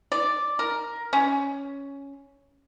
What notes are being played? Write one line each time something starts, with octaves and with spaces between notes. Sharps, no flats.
D5
A#4
C#4